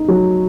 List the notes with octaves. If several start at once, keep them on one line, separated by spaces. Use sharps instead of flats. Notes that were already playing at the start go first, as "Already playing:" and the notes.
Already playing: D#4
F#3